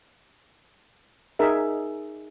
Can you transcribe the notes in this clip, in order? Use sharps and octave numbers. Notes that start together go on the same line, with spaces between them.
D#4 G#4 A#4 E5